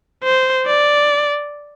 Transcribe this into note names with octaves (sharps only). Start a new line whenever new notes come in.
C5
D5